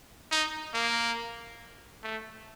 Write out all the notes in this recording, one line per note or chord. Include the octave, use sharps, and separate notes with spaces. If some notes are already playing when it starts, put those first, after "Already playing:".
D#4
A#3
A3